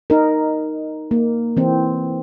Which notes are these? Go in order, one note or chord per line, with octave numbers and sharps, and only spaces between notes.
D#4 A#4
A#3
E3 C4